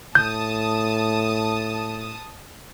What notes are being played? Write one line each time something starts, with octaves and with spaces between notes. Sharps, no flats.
A2 A5 D#6 G6